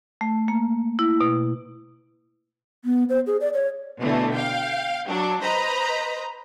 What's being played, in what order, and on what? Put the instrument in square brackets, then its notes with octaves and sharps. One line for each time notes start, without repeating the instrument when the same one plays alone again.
[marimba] A3
A#3
E4
B2
[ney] B3
C5
G#4
D5
C#5
[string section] B2 D3 E3 A3
F5 G5
F#3 D4
B4 C5 D#5 A#5 B5